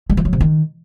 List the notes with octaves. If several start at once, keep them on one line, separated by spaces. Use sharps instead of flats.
G#3
F3
F#3
C3
D#3